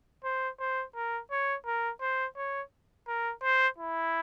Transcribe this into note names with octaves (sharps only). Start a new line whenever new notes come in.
C5
C5
A#4
C#5
A#4
C5
C#5
A#4
C5
E4